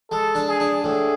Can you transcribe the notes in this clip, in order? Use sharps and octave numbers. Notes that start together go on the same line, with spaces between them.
G#3 A4
D4
G#4
D4
A2 G#4